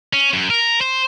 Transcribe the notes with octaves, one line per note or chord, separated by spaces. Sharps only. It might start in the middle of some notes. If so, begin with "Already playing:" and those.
C#4
F#2
A#4
C5